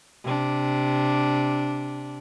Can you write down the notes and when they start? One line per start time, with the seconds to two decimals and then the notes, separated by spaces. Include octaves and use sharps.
0.24 C3 D4